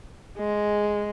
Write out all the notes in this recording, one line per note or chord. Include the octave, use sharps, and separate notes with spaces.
G#3